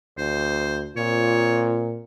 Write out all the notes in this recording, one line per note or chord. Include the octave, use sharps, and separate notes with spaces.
D2 C5
A#2 C4 F4 C#5